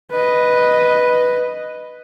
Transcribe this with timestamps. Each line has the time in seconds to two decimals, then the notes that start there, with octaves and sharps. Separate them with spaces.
0.11 B4 D#5